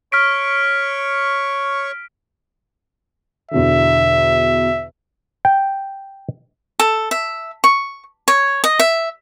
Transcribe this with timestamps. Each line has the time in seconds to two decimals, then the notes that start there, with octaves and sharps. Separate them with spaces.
0.12 C#5 C#6 F6 B6 D7
3.51 E2 B2 D3 E5
5.45 G5
6.80 A4
7.11 E5
7.64 C#6
8.28 C#5
8.64 D#5
8.79 E5